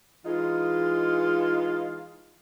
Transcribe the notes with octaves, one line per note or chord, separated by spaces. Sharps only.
E3 G#3 D#4 F4